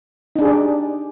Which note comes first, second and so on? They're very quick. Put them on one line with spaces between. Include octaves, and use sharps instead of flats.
D#4 D4 G#4 G4 D5